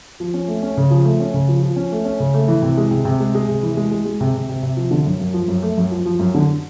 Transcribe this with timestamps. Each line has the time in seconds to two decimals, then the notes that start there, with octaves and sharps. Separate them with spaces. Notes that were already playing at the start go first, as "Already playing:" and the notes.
0.20 F3
0.34 C#4
0.48 A3
0.63 C#4
0.77 C#3
0.90 F3
1.05 A3
1.20 C#4
1.34 C#3
1.48 F3
1.62 F3
1.76 C#4
1.92 A3
2.05 C#4
2.20 C#3
2.34 A3
2.48 E3
2.62 C3
2.77 G#3
2.91 C3
3.05 C3
3.20 G#3
3.35 G#3
3.48 C3
3.63 E3
3.77 G#3
3.91 G#3
4.05 G#3
4.20 C3
4.34 C3
4.49 C3
4.63 C3
4.76 F3
4.91 D3
5.06 F#2
5.20 F#2
5.34 F3
5.48 F#2
5.62 A3
5.78 F#2
5.91 F3
6.05 F3
6.19 F#2
6.34 D3